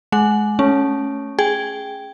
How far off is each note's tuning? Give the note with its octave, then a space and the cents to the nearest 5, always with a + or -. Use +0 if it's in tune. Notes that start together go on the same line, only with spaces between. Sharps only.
G#3 +25 F#5 +0
A3 -10 C#4 +0
G#4 +0 G5 +0